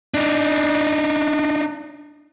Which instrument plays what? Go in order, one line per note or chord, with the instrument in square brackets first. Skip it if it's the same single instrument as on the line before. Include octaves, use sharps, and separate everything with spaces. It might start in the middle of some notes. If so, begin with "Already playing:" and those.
[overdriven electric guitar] D4 D#4